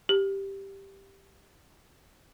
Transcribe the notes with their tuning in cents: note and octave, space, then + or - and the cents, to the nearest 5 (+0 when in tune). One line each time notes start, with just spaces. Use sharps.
G4 +0